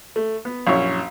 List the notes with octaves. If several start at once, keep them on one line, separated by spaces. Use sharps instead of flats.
A3
B3
A#1 F#2 E4 C#5 F5 C#6